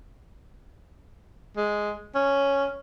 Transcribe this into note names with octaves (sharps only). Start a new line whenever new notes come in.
G#3
C#4